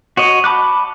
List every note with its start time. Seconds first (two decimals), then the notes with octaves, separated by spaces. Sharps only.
0.17 F#4 C#5 D#5
0.44 A5 B5 D6 F#6